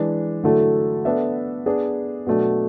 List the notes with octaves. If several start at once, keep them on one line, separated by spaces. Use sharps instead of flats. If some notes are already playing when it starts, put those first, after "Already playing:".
Already playing: E3 G#3 D4
D3 F#3 A3 E4 A4
B3 D4 A4 E5
B3 D4 G#4
B2 F#3 A3 D4